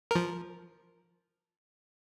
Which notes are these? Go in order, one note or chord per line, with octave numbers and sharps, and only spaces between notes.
F3 A#4